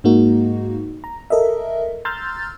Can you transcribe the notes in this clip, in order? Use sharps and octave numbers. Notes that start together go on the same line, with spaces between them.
G#2 G#3 A#3 D#4 F#4
A#5
A4 A#4 D#5 E5
A#5 C6 E6 F6 G6 A6